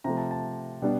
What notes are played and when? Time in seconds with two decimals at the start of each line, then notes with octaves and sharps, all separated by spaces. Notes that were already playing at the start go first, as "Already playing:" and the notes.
0.04 C3 F3 A3 A#5
0.17 A5
0.31 A5
0.82 B2 G3 B3 D4